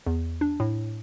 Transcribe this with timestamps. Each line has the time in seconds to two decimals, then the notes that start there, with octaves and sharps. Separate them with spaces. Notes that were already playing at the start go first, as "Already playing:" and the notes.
0.06 E2
0.41 D4
0.60 A2